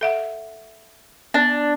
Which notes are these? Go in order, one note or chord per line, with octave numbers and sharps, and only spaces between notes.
A4 E5 F#5
B3 D4